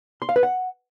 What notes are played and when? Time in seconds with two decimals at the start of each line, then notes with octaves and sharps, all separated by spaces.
0.22 C6
0.29 F5
0.36 B4
0.43 F#5